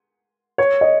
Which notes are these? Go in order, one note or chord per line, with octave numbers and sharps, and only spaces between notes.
C#5
D#5